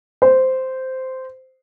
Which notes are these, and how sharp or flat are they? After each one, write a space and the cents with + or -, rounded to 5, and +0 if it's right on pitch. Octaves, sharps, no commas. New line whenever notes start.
C5 -10